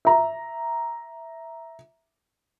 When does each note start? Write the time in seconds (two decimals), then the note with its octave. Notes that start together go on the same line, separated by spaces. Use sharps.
0.05 E5 A#5